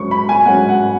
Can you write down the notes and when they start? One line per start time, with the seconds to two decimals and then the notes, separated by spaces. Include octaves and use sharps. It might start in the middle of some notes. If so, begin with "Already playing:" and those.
Already playing: G#2 F#3 C#4 C#6
0.11 B5
0.29 G#5
0.45 G#2 F#3 C#4 F#5
0.69 F#5